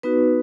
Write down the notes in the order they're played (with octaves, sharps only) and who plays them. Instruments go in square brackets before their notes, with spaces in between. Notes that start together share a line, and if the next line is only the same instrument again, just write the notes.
[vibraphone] B3 D#4 F#4 B4